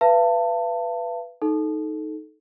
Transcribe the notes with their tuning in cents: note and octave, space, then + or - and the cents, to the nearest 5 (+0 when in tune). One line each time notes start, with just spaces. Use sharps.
B4 +0 F5 -45 A5 +25
D#4 +5 A4 -15